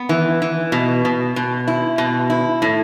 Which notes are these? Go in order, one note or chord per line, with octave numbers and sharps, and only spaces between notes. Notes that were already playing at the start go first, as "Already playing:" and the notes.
Already playing: B3
E3
E3
B2
B2
B2
E4
B2
E4
A2